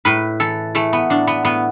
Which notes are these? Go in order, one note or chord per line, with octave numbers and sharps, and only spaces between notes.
A2 B4
E3 A4
E3 A3
B3
A2 D4
B3
A2 B3